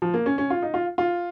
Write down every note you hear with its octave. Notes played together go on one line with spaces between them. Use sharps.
F3
A#3
C#4
C#4
F4
D#4
F4
F4